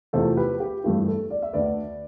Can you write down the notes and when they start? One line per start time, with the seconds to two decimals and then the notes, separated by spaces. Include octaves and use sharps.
0.13 E2 C3 F3 A3 A4 C5
0.37 G4 B4
0.60 G4
0.84 G2 E3 A3 E4 G4
1.08 A4
1.30 D5
1.42 E5
1.53 D2 D3 A3 B4 D5